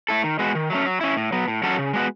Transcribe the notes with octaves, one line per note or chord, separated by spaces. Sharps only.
A3 E4 A4
D#3
G#3 B3 F#4
D#3
F#3 A3 C#4
F#3
C#4 E4
A2
F#3 B3
A2
F#3 C#4 F#4 A4
C#3
G#3 B3 F#4